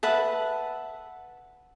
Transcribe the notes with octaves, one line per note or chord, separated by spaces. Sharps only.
B4 E5 F#5 A5